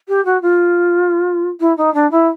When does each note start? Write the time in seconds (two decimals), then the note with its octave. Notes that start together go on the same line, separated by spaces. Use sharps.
0.08 G4
0.25 F#4
0.42 F4
1.60 E4
1.77 D#4
1.94 D4
2.11 E4